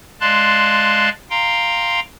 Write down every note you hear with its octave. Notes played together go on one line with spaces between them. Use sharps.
G#3 D5 F5 A5 C6 F#6
F5 G5 A#5 C6